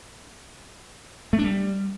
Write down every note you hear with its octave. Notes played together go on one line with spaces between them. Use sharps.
A3
D4
G3